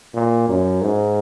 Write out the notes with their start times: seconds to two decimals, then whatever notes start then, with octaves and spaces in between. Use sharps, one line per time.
0.14 A#2
0.48 F#2
0.82 G#2